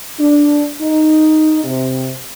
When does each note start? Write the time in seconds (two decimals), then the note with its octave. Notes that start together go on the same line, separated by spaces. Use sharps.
0.20 D4
0.81 D#4
1.65 C3